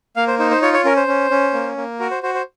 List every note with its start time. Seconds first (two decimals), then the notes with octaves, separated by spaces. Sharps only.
0.16 A#3 F5
0.28 C5
0.39 D#4 C5
0.51 C5
0.62 F4 C#5
0.73 C#5
0.85 C#4 A#4
0.96 C5
1.08 C#4
1.30 C#4
1.53 A#3
1.77 A#3
2.00 F#4 A#4
2.11 C5
2.23 F#4 C5
2.34 C5